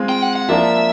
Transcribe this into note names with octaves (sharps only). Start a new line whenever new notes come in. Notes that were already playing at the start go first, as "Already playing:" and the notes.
Already playing: G#3 C4 F4
G5
F#5
F#5
F3 A#3 D4 E5